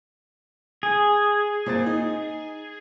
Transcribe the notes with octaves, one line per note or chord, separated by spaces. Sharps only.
G#4
A#2 C4 A6
D#4